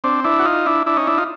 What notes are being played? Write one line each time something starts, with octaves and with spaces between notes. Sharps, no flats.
C4 D4
D4 E4
F#4
D#4 F4
D4 E4
D4 E4
C#4 D#4
D4 E4
D#4 F4